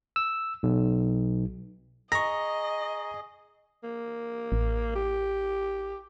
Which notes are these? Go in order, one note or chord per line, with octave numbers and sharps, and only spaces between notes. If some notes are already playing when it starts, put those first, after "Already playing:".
E6
B1
G#4 D#5 A#5 C#6 A#6
A#3
A1
G4